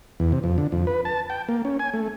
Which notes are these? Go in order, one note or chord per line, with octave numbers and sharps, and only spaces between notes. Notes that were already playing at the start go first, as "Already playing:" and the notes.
E2
C3
F2
D3
F2
B4
A5
G5
A#3
C#4
G#5
A3